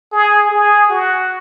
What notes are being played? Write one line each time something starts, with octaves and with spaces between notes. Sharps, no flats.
G#4
G#4
F#4